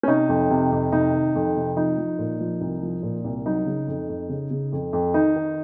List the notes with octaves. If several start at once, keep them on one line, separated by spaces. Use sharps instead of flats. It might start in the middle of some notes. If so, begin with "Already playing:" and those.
C#4
C3 D#4
F2
C3
F2
C3 D#4
D#3
F2
C3
F3 D#4
F3
A#2
F3
C2
F3
A#2
C2
F#3 D#4
C#3
F2
F2
C#3
C#3
F2
F2
D#3 D#4
D#3